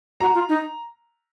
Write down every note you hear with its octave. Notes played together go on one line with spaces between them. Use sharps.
F#4 A#5
F4
D#4